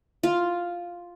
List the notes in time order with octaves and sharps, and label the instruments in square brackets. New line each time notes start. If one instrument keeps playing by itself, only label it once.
[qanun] F4